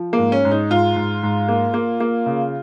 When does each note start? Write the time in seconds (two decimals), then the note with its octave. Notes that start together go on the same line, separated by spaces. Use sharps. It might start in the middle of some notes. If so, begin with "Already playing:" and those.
Already playing: F3
0.13 A#3
0.18 G#2
0.32 C#4
0.45 G#2
0.51 D#4
0.71 G#2 F4
0.96 G#2
1.23 G#2
1.48 A#3
1.74 A#3
2.00 A#3
2.26 C#3